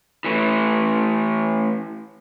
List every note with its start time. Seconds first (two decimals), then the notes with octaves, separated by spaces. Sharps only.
0.24 E3 A3